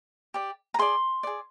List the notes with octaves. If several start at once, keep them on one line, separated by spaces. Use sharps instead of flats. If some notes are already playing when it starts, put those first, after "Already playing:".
G4 D5
A#5
G#4 D5 C6
G#4 D5